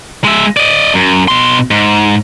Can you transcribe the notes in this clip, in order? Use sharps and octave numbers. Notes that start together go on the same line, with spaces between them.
G#3 E5
D5 D#5
F#2
B2 C6
G#2